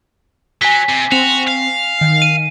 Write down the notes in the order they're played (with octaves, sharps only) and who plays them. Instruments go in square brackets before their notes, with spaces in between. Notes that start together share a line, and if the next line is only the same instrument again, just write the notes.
[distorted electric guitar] F#3 [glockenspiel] G#5 B6
[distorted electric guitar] C3
[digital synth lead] C4 [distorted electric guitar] F#4 [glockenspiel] F7
[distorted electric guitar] F5
[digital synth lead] D#3
[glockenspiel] D#7